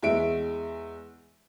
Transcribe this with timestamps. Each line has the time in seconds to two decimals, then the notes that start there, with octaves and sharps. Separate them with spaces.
0.03 E2 G#3 E5 D7